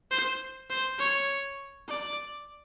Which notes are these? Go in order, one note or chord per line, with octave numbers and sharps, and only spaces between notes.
C5
C5
C#5
D5